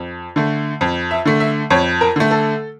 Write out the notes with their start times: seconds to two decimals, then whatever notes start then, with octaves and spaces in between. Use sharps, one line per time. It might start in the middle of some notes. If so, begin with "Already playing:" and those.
Already playing: F2
0.36 D3 A3
0.81 F2
1.11 E5
1.25 D3 A3
1.40 E5
1.70 F2 C#5
2.01 A#4
2.16 D3 A3
2.31 A4